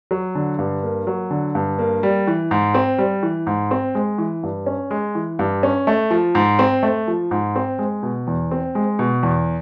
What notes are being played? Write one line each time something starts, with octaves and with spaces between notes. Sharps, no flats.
F#3
D3
G2
A#3
F#3
D3
G2
A#3
G3
E3
G#2
C4
G3
E3
G#2
C4
G#3
E3
G2
C#4
G#3
E3
G2
C#4
A3
F3
G#2
C4
A3
F3
G#2
C4
G#3
B2
E2
C4
G#3
B2
E2